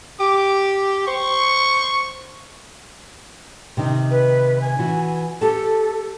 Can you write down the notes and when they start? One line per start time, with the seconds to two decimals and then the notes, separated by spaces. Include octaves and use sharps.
0.20 G4 D6
1.07 C5 C#6
3.77 C3 D#3 D#4
4.11 B4
4.61 G#5
4.79 E3 F#4
5.41 G4 A4 A5